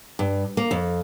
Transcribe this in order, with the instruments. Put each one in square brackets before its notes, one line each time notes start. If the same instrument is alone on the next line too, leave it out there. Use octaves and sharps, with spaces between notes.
[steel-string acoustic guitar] G2
A#3
F2